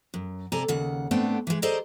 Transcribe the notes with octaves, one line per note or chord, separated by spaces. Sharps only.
F#2
C3 A4 D5 G#5 A#5
D#2 C#3 F#5
A2 D3 A3 B3 C4 D4
E3 G#3
G#4 A4 C5 D5 D#5 A#5